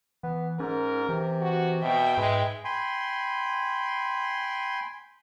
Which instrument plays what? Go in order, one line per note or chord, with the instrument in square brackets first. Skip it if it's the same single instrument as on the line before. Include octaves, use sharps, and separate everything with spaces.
[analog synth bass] E3 [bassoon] B3
[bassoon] G#2 [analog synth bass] C#4 [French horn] A#4
[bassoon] C3 [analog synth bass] E3
[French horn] F#4
[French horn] B2 [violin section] E5 G5
[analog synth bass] G#2 [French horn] G#3 [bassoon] B4
[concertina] G5 G#5 B5 C6